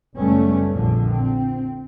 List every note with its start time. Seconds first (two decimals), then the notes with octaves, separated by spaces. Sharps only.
0.18 F#1 G3 A3 B3 C#4
0.74 A#1 F2 D3 F3
1.13 C4